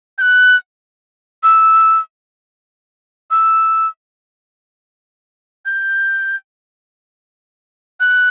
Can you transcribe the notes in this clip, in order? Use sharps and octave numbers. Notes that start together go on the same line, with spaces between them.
G6
F#6
E6
E6
G6
F#6